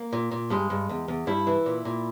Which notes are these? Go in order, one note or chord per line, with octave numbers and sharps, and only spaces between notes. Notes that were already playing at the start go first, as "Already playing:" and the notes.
Already playing: A#3
A#2
A#2
G2 G#3
G2
E2
E2
G2 E4
E3
A#2
A#2